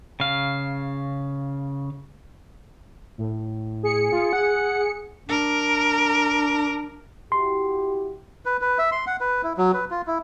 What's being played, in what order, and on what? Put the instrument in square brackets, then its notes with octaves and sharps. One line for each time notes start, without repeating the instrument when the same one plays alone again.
[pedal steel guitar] C#3 F5
[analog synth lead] A2
[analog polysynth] G#4 C#7
[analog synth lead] F4
F#5
[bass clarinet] D4 [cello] A#4
[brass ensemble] E4 F#4 G4 [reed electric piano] C6
[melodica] B4
B4
E5
C6
F#5
B4
E4
F#3
B4
F4
E4